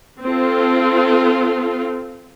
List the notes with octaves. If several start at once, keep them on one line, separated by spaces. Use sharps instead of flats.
C4 F4 A4